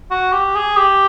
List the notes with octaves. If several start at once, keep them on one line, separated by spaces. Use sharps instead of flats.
F#4
G4
G#4
G4